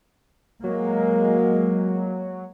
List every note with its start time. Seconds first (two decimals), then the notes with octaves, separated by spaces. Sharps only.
0.63 F#3 G#3 A#3